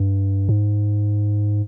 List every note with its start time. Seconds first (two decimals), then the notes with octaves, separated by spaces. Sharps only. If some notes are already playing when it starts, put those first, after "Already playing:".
Already playing: G2
0.49 G#2